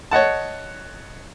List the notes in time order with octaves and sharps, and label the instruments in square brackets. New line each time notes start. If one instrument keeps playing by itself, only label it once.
[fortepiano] C#5 D#5 F#5 A5